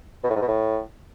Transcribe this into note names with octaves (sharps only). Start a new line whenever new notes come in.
B2
A2
G#2
B2
A2